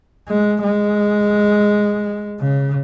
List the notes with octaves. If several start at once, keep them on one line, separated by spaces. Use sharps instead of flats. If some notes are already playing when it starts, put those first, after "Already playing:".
G#3
G#3
C#3